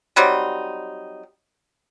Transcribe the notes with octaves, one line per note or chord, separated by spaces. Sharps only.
F#3 G3 C4 D#4